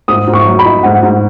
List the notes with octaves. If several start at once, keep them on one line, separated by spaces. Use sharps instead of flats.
G#2 D#6
G#2
C#6
F#3
B5
D#4
G#2 F#5
G#2